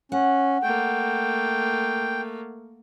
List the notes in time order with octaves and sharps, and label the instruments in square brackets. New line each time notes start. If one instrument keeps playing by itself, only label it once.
[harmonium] C#4 [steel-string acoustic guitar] F#5
[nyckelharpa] A3 A#3 [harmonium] G5